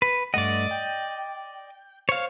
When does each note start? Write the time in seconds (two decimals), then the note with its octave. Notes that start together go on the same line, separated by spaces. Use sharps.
0.02 B4
0.34 G2 A3 D5 D#5 F#5
0.71 G5
2.09 C5 C#5 F5